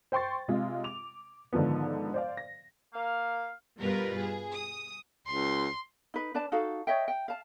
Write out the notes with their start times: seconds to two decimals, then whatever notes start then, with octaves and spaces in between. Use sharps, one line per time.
0.12 C5 G5 C6 C#6 A6
0.48 C3 G#3 F4
0.84 D6 F7
1.53 G#2 D3 D#3 F3 B3
2.14 C5 D5 F5
2.37 A#6
2.94 A#3 F5
3.80 G2 B2 G3 F4 A#4 B4
4.17 G#4
4.53 D#6
5.27 C#2 C6
6.14 D#4 B4
6.34 D4 B4 D5 A5
6.52 D#4 F#4 A4 F5
6.87 C#5 D#5 E5 G5
7.08 G5
7.28 F5 A5